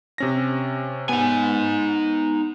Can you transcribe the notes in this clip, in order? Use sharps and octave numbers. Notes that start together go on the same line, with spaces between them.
C3 C#4 A#6
B3 D#4 G#5